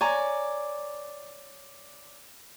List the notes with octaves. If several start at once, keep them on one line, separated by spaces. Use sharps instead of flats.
C#5 D5 G#5 A#5